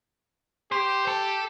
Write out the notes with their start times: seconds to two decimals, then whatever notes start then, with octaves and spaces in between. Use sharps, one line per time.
0.72 G4 C5
1.07 A4